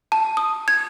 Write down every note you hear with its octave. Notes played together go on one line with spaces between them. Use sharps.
A5
D#6
G#6